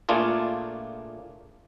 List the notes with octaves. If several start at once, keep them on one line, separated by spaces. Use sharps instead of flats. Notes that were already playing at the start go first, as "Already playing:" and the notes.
A#2 A3 A#3 D4 F4 G#4